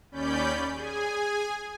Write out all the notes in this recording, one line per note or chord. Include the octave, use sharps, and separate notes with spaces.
D#2 C#4 D5 B5 G6
G#4 G#5